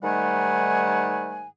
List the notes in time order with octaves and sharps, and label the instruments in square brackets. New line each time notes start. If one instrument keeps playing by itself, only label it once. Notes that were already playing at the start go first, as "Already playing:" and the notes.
[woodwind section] G#2 D#3 G3 A3 F#5 G#5